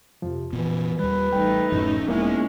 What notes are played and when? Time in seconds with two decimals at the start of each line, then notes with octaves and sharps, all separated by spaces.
0.22 F2 C3 F3
0.53 F1 A#2 E3 B3
0.99 D#2 G3 B4
1.33 A1 G3 A3 D#4 G5
1.72 D1 F#2 A2 F3 C#4
2.08 E1 G#3 A#3 B3 C#4 D#4 E4